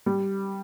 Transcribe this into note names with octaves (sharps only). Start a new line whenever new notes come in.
G3